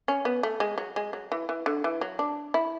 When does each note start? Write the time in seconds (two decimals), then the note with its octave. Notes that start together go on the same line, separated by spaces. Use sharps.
0.08 C#4
0.25 B3
0.43 A3
0.60 G#3
0.78 F#3
0.96 G#3
1.13 F#3
1.32 E3
1.49 E3
1.66 D3
1.84 E3
2.01 F#3
2.19 D4
2.54 E4